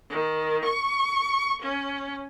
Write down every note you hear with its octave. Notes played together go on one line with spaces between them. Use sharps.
D#3
C#6
C#4